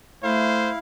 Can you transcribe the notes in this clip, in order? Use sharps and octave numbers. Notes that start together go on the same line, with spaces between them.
A3 E4 C5 F5